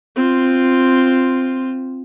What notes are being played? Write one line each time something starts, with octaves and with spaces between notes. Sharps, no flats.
C4 F4